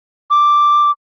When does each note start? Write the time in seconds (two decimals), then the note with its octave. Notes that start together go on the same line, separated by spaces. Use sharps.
0.30 D6